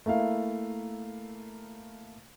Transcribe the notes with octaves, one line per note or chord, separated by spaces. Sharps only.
A3 A#3 E4 F5